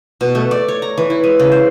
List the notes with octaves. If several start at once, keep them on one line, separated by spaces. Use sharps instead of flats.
B2
A3
D5
C#5
A#5
E3
E4
G#3
C#3
C5